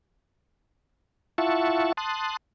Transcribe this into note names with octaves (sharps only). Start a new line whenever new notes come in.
E4 F4 E5 F#5 A5 C#6
A5 C6 D#6 F#6